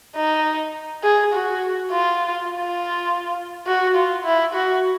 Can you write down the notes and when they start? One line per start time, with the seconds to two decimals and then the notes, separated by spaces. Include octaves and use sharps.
0.16 D#4
1.04 G#4
1.33 F#4
1.91 F4
2.49 F4
3.67 F#4
3.95 F4
4.25 E4
4.54 F#4